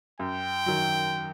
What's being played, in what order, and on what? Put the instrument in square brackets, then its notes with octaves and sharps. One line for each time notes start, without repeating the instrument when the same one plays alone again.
[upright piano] F#2 [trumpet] G5
[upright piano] D#3 F#3